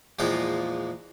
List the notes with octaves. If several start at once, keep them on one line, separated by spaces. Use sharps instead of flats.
E2 A#2 F3 G#3 F4 G5